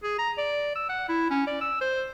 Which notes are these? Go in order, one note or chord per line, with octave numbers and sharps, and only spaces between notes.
G#4
A#5
D5
E6
F#5
E4
C#4
D5
E6
C5